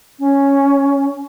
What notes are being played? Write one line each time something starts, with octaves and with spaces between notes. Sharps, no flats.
C#4